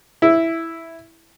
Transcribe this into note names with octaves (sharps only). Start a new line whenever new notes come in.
E4